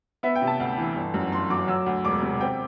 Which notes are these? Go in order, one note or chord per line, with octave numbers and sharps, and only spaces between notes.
B3 E5
G5
C3
A5
D2
E3
G1
F#2
G1 C6
F#3 D6
F#3 E6
D2
E1 D6
C3
C4 G5